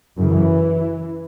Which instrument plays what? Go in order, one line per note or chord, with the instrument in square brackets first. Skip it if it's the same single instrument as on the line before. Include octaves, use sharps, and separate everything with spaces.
[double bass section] F#2 C#3 E3